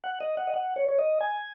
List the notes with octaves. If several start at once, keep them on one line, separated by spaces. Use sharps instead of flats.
F#5
D#5
F#5
D#5
F#5
C#5
C#5
D#5
G#5